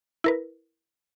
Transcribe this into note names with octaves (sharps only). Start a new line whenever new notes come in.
E4 A#4 B4